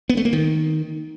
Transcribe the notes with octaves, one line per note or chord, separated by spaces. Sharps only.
B3
A3
A#3
D#3